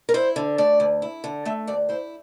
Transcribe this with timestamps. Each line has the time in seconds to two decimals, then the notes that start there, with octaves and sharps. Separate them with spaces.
0.09 A#4
0.14 E4 C5
0.36 D3
0.58 A3 D5
0.80 D2
1.02 E4
1.24 D3
1.45 A3 E5
1.67 D2 D5
1.89 E4 C5